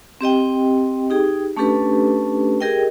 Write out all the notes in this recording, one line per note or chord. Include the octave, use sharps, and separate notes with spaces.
C4 G4 D#5 G5
D#4 G4 G#4 G5
A3 C#4 D4 G4 A4 B4
G4 G#4 A#4 D#5 G5